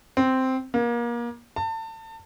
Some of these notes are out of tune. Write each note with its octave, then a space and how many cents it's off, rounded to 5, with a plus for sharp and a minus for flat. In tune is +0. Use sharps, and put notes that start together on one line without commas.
C4 -5
A#3 +30
A5 +30